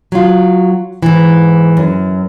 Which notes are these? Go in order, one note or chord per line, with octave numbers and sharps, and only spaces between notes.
F#3 F4
G#2 E3
F#2